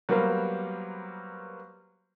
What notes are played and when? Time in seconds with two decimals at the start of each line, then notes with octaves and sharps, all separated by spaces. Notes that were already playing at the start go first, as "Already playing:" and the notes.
0.09 F#3 G3 A#3 B3 A#4 C5